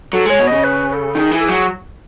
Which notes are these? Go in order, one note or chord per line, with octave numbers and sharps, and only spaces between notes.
F#3 A4
G#3 C#5
B2
C#3 D#5
B4
B4
A4
D#3 G#4 A4
E3
A4
F#3 G#4